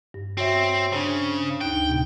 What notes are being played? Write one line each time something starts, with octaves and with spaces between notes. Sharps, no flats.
G2
C4 F#4 C#5 E5
C#3 D4 C5
D2 D#4 G5 F#6
A2 C3